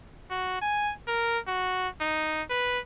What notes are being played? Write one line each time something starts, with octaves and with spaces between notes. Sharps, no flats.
F#4
G#5
A#4
F#4
D#4
B4